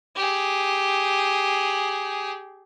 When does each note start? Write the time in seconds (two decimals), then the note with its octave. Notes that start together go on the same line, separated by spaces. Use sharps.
0.16 G4 G#4